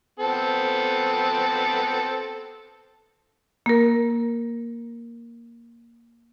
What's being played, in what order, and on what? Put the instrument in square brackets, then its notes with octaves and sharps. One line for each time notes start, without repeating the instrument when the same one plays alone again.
[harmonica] B3 C4 A4
[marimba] A#3 A#4